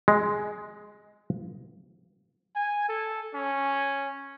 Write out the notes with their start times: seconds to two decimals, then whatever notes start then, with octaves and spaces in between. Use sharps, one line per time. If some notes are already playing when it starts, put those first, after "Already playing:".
0.08 G#3
2.56 G#5
2.89 A4
3.34 C#4